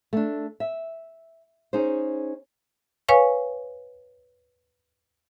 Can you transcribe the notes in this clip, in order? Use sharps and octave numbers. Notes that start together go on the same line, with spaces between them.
A3 D4
E5
C#4 D#4 G#4 C5
B4 C#5 F5 G#5 C#6